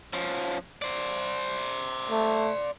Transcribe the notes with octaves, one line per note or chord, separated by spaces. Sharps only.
F3 C#4
C5 D5
A3